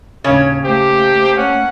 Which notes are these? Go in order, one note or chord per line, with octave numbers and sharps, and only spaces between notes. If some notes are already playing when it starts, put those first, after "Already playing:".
D#2 A2 C#3 C#5
A3 A#3 G4 C5
C#4 F#5